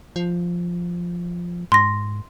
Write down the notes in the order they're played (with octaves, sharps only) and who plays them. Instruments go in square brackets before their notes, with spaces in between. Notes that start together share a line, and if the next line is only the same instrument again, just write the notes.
[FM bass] F3
[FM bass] G#2 [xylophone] C6 A#6